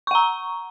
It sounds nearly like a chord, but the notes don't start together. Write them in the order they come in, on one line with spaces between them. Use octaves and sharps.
C#6 F#5 A#5